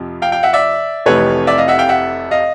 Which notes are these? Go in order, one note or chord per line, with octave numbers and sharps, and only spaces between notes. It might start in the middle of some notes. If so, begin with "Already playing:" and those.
Already playing: F2 C3 F3
F5 G5
F5 G5
E5 F#5
D5 E5
F1 F2 C3 E3 A3 B4 C#5
D5 E5
D#5 F5
E5 F#5
F5 G5
E5 F#5
D#5 F5